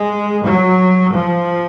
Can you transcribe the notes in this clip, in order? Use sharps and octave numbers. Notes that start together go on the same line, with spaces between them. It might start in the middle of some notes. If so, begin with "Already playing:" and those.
Already playing: G#3
F#3
F3